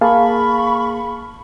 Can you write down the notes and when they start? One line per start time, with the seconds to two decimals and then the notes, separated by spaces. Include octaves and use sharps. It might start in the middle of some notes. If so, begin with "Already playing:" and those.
0.01 A#3 G#4 F5 A5 B5 C#6